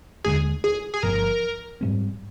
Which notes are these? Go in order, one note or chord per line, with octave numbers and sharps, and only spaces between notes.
D#2 D3 G#3 D4 G#4
G#4
G#4
G1 G2 F3 A#4
G#2 G3 C4